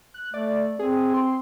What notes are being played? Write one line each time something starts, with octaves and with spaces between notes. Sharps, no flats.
F#6
A3 D5
C4 G#4
C6